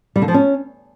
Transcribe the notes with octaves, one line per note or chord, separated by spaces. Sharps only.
G3
D3
F3
C#4